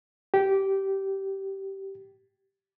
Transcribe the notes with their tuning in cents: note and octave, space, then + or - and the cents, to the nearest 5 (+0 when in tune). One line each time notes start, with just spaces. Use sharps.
G4 -15